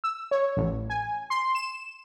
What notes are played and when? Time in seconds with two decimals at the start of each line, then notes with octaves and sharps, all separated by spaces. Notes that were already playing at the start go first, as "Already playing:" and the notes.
0.04 E6
0.31 C#5
0.57 A1
0.90 G#5
1.30 C6
1.55 E7